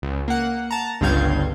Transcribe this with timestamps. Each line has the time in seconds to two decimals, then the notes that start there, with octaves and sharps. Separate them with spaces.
0.02 C#2
0.28 A#3 F#5
0.71 A5 A#5
1.01 G1 C#2 G2 F5 G6 G#6